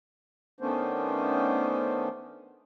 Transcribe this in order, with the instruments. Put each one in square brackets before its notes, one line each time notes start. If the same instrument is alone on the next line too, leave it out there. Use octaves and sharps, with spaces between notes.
[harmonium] D#3 A3 B3 C#4 D4 C5